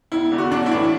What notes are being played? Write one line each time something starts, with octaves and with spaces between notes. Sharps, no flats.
E1 E4
E2 D3
F#4
B1 D4
E4
A2 E3 D4